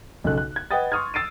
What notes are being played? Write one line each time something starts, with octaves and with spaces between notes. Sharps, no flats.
B1 C#3 A4 F#6
F#6
G#6
B4 D#5 F#5 G5 D#6 A6
C6 C#6 D#6 F6 G#6
E6 A6 C7 D7 D#7